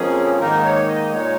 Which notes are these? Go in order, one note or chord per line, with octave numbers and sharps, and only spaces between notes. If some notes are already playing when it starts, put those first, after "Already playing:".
Already playing: F2 F3 A#3 C#4 G#4
G#2 D#3 A#3 D#4 A#4
C#5
D#5
A#2 G#3 D#4 C#5